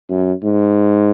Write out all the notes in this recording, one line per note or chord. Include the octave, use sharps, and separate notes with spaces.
F#2
G#2